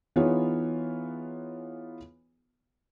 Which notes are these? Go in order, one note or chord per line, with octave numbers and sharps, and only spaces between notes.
E3 B3 D#4 F4 G#4 C#5